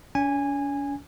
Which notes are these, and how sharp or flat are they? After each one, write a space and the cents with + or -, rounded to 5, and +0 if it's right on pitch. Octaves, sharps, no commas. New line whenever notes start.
C#4 +45 G#5 -15